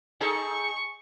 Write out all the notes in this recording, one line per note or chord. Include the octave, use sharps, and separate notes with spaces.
D#4 G#4 A4 C#6